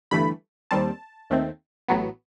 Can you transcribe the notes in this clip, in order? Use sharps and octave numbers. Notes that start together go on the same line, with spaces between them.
G1 G2 E3 A3 B5
D#2 D#3 G3 C4 A5
D#2 D#3 A3 C4
A1 A2 F#3 B3